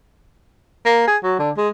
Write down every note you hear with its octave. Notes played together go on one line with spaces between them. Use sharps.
A#3
G#4
F#3
D3
G#3